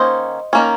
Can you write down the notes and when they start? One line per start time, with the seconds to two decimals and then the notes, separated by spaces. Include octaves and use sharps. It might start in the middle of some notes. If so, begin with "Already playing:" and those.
Already playing: D#3 A#3 C#4 C5 D#5
0.53 D#3 A#3 C#4